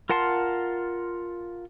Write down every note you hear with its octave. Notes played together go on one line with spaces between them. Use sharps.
F4 A#4 F#5 A5 C6